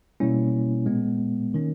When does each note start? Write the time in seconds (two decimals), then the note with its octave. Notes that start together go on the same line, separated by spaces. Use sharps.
0.20 B2 G3 A#3 C#4 E4
0.86 A#2 G#3 B3
1.54 D#3 A#3 C#4